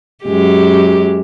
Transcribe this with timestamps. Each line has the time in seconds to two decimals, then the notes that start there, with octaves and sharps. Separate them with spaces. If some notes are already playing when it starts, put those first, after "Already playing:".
0.24 F#2 G#3 G4